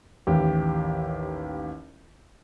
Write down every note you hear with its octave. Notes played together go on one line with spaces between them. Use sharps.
A1 D#2 G4